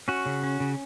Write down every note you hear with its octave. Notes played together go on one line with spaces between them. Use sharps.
C#4 F#4
C#3
C#4
C#3